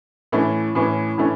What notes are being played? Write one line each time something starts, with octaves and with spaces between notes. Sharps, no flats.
A2 E3 A3 C#4
A2 E3 A3 C#4
A2 E3 A3 C#4